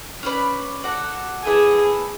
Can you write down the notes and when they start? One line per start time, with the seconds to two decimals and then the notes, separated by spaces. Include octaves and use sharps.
0.23 C#4 G#4 B4 D5
0.84 F#4 A4 D5 F#5
1.44 B3 E4 G#4 A4 D5